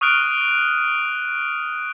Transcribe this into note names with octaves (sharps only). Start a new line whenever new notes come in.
C#6 D#6 F6 F#6 D7